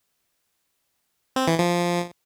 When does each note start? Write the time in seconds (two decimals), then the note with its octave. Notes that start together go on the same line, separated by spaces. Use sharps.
1.36 C4
1.48 E3
1.59 F3